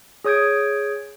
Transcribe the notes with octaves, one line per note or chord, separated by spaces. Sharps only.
G#4 C#5 D#6 G6 G#6 D7